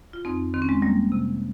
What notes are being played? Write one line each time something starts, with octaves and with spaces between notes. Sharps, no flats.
F4
F2 C4 D#4
D#3 C4
C#4
G#3 C4
G3 A#3
C3